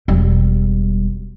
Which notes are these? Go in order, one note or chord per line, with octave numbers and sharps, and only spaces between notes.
E1 G3